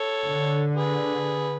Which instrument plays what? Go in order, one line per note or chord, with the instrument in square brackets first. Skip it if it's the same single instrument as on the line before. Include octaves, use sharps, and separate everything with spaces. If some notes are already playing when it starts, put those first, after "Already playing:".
Already playing: [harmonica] A4 C#5
[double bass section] D3
[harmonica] G#4 B4